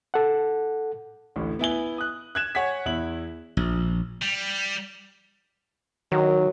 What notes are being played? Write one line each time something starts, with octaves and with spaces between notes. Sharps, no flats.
A4 F#5
A1 D2 A2
B3 E4 G#5 G7
D#6 F#6
F#6 G#6 E7
C#5 F#5 G#5 G#6 B6
E2 E4 F#7
A#1
G3
D#3 F#3